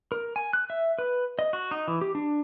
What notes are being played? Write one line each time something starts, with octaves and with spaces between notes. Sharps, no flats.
A#4
G#5
F#6
E5
B4
D#5
F#4
D#4
E3
G4
D4